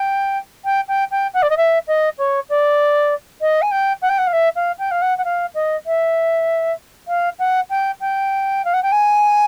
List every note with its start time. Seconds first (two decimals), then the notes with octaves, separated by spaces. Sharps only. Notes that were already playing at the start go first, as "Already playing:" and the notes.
Already playing: G5
0.64 G5
0.88 G5
1.11 G5
1.34 F#5
1.42 D5
1.50 D#5
1.57 E5
1.87 D#5
2.18 C#5
2.49 D5
3.41 D#5
3.62 G#5
3.71 G5
4.02 F#5
4.09 G5
4.18 F#5
4.27 F5
4.33 E5
4.56 F5
4.78 G5
4.91 F5
5.02 F#5
5.18 F#5
5.24 F5
5.54 D#5
5.86 E5
7.08 F5
7.39 F#5
7.70 G5
8.00 G5
8.65 F5
8.73 F#5
8.83 G5
8.92 G#5